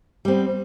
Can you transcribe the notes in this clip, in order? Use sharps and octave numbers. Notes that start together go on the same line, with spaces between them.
G3 B3 C4